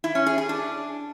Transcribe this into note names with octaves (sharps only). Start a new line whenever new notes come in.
E4
C#4
G#4
G#4
D4